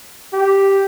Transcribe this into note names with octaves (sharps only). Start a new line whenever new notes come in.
G4